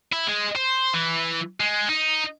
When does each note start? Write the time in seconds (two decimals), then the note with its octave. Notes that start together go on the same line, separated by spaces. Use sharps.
0.12 E4
0.27 G#3
0.55 C5
0.93 E3
1.60 G#3
1.89 D#4